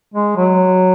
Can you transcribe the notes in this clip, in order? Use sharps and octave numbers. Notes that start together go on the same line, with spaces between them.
G#3
F#3